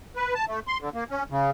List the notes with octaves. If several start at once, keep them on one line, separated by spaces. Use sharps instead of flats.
B4
A5
A3
C6
D3
A#3
C#4
C#3